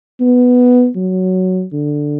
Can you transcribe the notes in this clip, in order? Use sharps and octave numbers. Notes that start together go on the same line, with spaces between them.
B3
F#3
D3